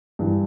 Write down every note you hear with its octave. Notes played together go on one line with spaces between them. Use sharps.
G2 E3